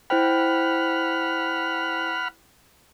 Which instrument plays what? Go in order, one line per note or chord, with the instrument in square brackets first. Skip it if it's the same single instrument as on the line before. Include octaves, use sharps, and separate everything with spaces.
[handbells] E4 C5 G5 [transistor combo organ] F#5 B5 F6